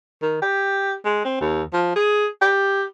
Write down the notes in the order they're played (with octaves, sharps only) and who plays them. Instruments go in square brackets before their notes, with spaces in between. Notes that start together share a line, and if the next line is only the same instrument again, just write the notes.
[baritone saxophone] D#3
G4
G#3
C4
D#2
F3
G#4
G4